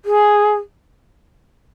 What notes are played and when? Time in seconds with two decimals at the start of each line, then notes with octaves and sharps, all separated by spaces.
0.05 G#4